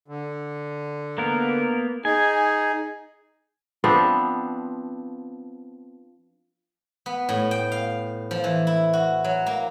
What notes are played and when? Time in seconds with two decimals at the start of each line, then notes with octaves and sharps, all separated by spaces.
0.08 D3
1.18 A#3 B3 A#4
2.05 D#4 G#4 G#5
3.84 F3 B3 C4 D4
7.06 B3
7.29 A2
7.51 G5
7.72 F5
8.31 F3
8.44 E3
8.67 E4
8.93 F#4
9.24 F#3
9.46 A#3